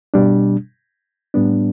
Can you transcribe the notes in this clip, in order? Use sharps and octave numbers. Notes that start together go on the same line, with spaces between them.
B2 G3 D4
A2 G3 B3 D4